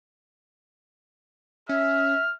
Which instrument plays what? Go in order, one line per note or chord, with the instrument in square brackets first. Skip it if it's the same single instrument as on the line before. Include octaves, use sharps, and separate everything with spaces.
[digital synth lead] C#4 [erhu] E5 [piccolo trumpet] F6